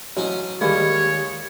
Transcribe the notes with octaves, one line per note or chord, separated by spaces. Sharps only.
A1 F#3 C#4 D#4
D#2 G3 G#3 A#3 C#5 B5